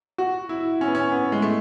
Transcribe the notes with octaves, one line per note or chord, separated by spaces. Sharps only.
F#4
E4
C#4
B3
C#4
B3
G#3
A3